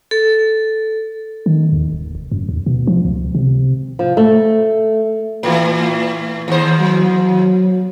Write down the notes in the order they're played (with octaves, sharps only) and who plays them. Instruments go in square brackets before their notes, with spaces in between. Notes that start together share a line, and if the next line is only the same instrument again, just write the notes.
[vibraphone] A4
[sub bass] D#3
D#2
D1
F1
F#2
D#2
B2
F3
C#2
C3
[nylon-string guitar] F3
A3
[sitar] A2 E3
D#2 C5
[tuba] F#3